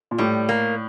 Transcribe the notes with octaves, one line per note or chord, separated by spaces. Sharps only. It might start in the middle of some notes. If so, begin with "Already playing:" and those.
A#2
A2 G3
A#3